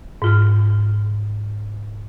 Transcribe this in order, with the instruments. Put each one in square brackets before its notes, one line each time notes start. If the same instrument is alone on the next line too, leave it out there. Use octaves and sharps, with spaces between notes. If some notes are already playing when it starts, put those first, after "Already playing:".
[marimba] G#2 F4 F6